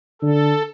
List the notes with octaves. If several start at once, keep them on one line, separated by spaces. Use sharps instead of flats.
D3 A4